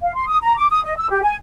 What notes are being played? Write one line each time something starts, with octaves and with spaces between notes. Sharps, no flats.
F5
C6
D#6
A#5
D6
D#6
D#5
E6
G4
G#5